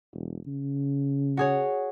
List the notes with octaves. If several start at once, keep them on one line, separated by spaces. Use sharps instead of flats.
E1
C#3
F#4 G#4 C#5